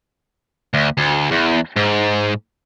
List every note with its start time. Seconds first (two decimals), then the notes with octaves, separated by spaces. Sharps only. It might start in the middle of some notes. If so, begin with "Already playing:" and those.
0.74 D2
0.98 D2
1.31 E2
1.76 G#2